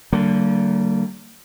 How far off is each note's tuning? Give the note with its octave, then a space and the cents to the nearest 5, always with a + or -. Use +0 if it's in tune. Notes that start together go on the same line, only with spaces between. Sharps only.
D3 +0 G3 -40 A#3 -30